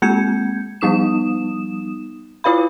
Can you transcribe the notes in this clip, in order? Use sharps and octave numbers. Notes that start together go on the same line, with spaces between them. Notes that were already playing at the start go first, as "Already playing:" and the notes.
G#3 A#3 C4 G6 G#6 C#7
F3 G3 B3 D#4 D#6 E7
E4 F4 B4 F5 B5